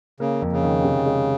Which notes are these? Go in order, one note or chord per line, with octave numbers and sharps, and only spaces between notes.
C#3 A#3
F2
C#3
D#3
C3
G#3